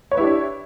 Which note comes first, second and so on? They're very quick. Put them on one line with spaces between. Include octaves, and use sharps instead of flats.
C#5 B4 E4 G4 D4